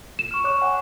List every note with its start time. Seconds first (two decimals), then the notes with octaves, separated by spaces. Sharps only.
0.19 E7
0.31 C#6 F6
0.44 C#5 D6 F#6
0.61 F#5 G#5